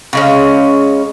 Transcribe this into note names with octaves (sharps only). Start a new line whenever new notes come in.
C#3 G#3 C#4